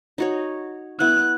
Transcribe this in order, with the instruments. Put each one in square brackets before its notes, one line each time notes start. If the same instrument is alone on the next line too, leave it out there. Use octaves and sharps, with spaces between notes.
[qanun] D#4 F#4 C#5
[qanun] B3 E4 [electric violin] F#6